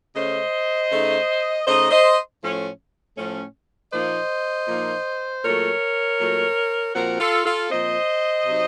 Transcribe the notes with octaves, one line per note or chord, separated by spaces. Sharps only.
C#3 A3 C#4 C5 D#5
C#3 A3 D#4
C#3 A3 D#4 C5 D#5
C5 D#5
A2 F3 A3 C#4
A2 F3 A3 C#4
A#2 F3 A#3 D#4 C5 D#5
A#2 F3 A#3 D#4
A#2 F#3 A3 A#4 C#5
A#2 F#3 A3
A#2 F3 C4 F#4 A#4
F4 A4
F4 A4
A#2 F3 C4 C5 D#5
C3 F#3 C4 D#4